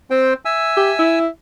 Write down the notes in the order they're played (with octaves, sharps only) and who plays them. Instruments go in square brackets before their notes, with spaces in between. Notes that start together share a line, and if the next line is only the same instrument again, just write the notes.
[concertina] C4 C5 G5
E5 G#5 E6
[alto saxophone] G4
E4